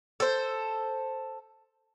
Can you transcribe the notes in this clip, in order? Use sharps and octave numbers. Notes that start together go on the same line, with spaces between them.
A4 C5